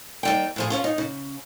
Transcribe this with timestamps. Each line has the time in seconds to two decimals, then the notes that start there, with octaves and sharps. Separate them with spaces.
0.23 D#2 G3 G5
0.56 A2 F3 G#4
0.70 C#4 F4 C#5
0.84 D#4
0.98 C#3